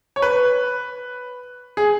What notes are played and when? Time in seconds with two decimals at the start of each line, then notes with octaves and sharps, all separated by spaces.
0.16 C#5
0.22 B4
1.77 G#4